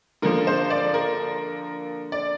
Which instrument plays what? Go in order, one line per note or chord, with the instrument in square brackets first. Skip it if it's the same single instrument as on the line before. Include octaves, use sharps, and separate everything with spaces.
[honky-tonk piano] D3 F3 A#3 A#4
C5
D5
A#4
D5